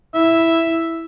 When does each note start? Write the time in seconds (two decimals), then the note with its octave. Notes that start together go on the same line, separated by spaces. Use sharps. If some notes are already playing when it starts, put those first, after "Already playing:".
0.15 E4 E5